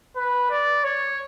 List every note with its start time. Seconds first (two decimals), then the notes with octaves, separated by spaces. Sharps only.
0.16 B4
0.50 D5
0.84 C#5